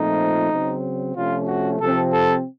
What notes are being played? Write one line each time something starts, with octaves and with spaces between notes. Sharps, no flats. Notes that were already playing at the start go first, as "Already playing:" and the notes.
Already playing: A#2 F3 A3 C4 D#4
C#3 F#3 C4
C3 F3 A3 C#4 F4
F#4
C3 F3 C4 A4
A4